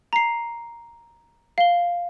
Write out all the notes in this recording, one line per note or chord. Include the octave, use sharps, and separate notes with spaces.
A#5 C7
F5 G7